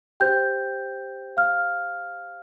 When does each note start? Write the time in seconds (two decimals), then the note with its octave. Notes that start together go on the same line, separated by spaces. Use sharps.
0.20 G4 C5 G5 G6
1.37 F5 F6